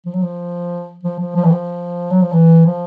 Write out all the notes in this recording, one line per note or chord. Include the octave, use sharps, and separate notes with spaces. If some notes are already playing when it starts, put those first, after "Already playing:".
F3
F#3
F3
F3
F3
F3
E3
F3
F#3
F3
E3
F3